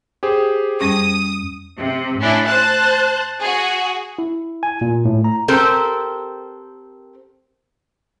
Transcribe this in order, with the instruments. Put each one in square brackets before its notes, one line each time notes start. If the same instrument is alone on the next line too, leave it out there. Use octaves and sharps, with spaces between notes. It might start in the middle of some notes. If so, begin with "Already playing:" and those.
[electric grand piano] G4 G#4 C5
[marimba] F2 G3 C#4 [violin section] D#6
[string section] C3
A2 C#4 D4 E4
C5 A5 F#6
F#4 G#4
[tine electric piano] E4
G#5
A#2
A2
A#5
[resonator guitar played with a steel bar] C4 G4 A4 A#4 C5